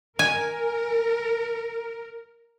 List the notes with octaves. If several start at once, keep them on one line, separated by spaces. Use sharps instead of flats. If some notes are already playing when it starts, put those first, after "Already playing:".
A#4 G#5